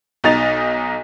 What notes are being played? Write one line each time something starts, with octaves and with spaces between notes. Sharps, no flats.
B1 D#4 D#5 A6 F7